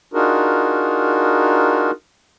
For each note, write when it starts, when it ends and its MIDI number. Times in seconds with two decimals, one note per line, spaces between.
0.14 1.91 62
0.14 1.91 63
0.14 1.91 65
0.14 1.91 66
0.14 1.91 68
0.14 1.91 70